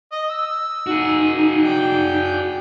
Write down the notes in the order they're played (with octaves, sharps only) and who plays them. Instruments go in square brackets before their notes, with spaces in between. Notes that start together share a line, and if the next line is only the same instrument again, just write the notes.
[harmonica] D#5
E6
[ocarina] D#4 [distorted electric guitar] F#4 G#4
[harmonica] D5 G5